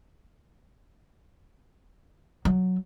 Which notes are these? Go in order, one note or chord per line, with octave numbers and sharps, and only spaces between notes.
F#3